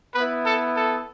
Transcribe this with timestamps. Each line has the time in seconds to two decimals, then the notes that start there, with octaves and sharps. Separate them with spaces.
0.14 B3 E4 B4
0.46 A4
0.77 A4